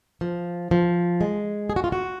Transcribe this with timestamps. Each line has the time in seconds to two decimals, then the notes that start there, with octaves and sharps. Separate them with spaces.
0.21 F3
0.71 F3
1.21 G#3
1.70 G#4
1.76 F#4
1.84 F4
1.92 F#4